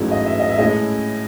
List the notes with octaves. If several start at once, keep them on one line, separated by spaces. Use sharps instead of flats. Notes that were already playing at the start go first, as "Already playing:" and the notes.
Already playing: A1 G#2 F#3 A3 E4 C#5
D#5
E5
D#5
E5
A2 G#3 C#4 E4 D#5